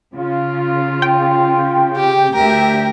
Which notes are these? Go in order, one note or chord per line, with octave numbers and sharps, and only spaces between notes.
C#3 F4
G5
G4
D2 G4 A#4 E5